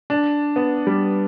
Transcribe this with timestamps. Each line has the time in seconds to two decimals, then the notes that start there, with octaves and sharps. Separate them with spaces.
0.10 D4
0.56 B3
0.87 G3